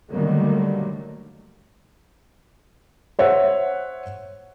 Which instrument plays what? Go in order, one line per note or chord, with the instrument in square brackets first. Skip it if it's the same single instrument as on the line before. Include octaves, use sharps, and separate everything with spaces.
[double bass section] D3 D#3 F#3 G3 A3 A#3
[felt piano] C5 C#5 E5 F#5